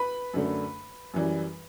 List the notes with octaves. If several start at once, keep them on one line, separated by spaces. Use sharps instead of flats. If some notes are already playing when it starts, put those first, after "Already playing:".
Already playing: B4 B5
F#2 D3 A3
F#2 E3 G3